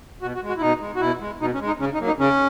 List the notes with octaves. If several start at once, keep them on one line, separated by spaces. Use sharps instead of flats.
B2 F#4
F#4
G#3
F#4
E4
B2 D#4
G#3
F#4
B2 E4
G#3
B2 D#4
C#4
G#3
D#4
C#3 C#4
D#4
F#3 A#3
D#4
C#3 C#4